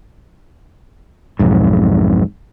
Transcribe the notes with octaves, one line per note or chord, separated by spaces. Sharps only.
B1 F2 G#2